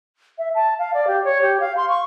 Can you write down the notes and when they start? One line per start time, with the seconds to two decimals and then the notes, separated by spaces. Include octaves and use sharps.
0.38 E5
0.55 A5
0.78 F5
0.94 D5
1.07 G4
1.24 C#5
1.42 G4
1.60 F5
1.77 C6
1.89 C#6